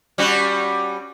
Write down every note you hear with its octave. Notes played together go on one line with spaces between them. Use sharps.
G3 C#4 F#4